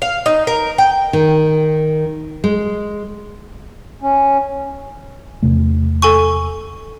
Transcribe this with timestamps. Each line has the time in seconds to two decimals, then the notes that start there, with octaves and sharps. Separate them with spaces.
0.02 F5
0.26 D#4
0.47 A#4
0.78 G5
1.13 D#3
2.44 G#3
4.02 C#4
5.43 E2 C3 A3
6.02 A4 G#5 C#6